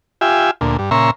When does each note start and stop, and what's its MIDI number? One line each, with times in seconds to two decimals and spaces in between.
0.21 0.51 65
0.21 0.51 67
0.21 0.51 76
0.21 0.51 80
0.61 0.77 38
0.61 0.77 46
0.79 0.90 43
0.91 1.11 46
0.91 1.11 49
0.91 1.11 76
0.91 1.11 82
0.91 1.11 84
0.91 1.11 85